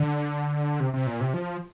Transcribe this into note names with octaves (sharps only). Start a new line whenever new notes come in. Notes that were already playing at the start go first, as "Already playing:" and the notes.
Already playing: D3
C3
C3
A#2
C3
F3